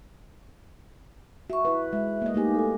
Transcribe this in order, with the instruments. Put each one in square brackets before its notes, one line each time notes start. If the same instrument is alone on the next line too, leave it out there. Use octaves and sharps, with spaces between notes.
[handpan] F#4 [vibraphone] E5 C#6
[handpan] E4 B4
[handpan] G#3 [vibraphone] E5
[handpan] A#3 D#5
[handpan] A3 A#3 G4 [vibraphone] D#4 G#5
[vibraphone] A4 G#5